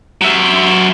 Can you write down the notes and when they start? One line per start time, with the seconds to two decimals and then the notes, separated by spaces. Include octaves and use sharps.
0.21 F#3 E5